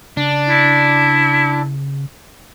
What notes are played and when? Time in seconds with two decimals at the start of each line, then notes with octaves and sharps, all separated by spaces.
0.17 C#3 D4
0.49 E4